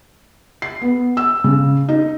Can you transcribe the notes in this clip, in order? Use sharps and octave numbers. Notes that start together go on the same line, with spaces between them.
C7
B3
E6
C#3
D#4